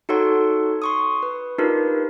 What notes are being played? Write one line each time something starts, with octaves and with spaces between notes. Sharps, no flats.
D#4 F#4 A4 C#5 F#5 C6
C6 C#6 D#6
B4
D4 D#4 F4 G4 A#4 B4